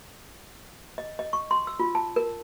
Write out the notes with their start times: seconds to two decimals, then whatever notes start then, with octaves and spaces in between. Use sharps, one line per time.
0.98 D#5
1.19 D#5
1.33 C#6
1.51 C6
1.67 E6
1.80 F4
1.95 A5
2.16 A#4